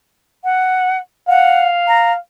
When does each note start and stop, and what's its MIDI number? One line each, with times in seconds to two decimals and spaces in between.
0.44 0.98 78
1.28 2.14 77
1.28 1.67 78
1.88 2.12 82